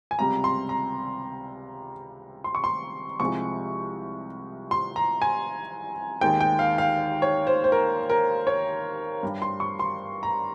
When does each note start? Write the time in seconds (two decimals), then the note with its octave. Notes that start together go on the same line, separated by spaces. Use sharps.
0.11 G#5
0.19 C#2 C3 G3 A#5
0.44 C6
0.69 A#5
2.44 C6
2.55 C#6
2.64 C6
3.20 C2 C3 F3 G#3 C#6
4.71 C6
4.96 A#5
5.22 G#5
6.21 D#2 D#3 G#3 G5
6.41 G5
6.59 F5
6.78 F5
7.22 C#5
7.47 C5
7.64 C5
7.72 A#4
8.10 A#4
8.47 C#5
9.23 G2 G3
9.42 C6
9.60 C#6
9.80 C6
10.23 A#5